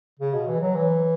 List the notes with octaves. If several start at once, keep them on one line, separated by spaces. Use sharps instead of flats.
C#3
B2
E3
F#3
E3